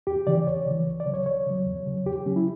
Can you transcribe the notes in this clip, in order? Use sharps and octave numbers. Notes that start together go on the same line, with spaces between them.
E2 G4
C#3 E3 D5
E2 C#5
C#3 E3
C#2
D5
C#3 F#3
C#5
C#2 C#5
C#3 F#3
E2
C#3 F#3
E2 G4
G4
C#3 F#3 C#4
E4